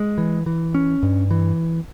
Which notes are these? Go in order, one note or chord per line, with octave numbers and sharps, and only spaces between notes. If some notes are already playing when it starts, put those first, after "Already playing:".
Already playing: G#3
E3
E3
C#4
G2
E3